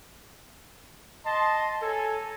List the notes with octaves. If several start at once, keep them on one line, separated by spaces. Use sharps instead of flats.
D#5 A5 C6
A4 C#5 G#5 A#5